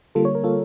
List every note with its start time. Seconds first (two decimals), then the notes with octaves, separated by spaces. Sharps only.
0.15 D3 G3 A#3 F4 A4
0.25 C#5
0.35 A#4
0.44 F4 A4